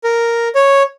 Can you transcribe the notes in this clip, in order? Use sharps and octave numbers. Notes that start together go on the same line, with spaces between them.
A#4
C#5